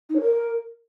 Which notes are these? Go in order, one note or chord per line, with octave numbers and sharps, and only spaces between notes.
D#4
C#5
A#4